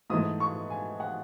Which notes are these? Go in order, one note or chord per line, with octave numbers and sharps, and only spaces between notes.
G#2 E3 A3 D#6
C#6
G#5
F#5